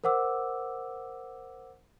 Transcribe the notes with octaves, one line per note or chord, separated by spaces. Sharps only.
A#4 C5 F#5 D6 E6